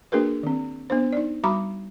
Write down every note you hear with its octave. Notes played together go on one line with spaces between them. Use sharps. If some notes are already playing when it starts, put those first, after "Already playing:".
A#3 D4 F#4 G#4 A#4 B4
D#3 C4
B3 D4 C5
D#4 D5
G3 F#4 A#5 B5 D6